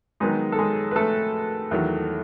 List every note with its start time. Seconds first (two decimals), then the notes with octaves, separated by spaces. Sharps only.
0.20 D#3 F#3 G#3 B3 D#4 G#4
0.52 A4
0.59 G#3 G#4
0.91 B4
0.96 A3 A4
1.71 E2 D#3 F#3